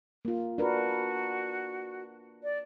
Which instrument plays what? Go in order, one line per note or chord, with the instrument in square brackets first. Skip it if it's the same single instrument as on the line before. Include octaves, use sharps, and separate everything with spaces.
[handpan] A#3 F4
[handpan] D4 A#4 B4 [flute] F#4
[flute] D5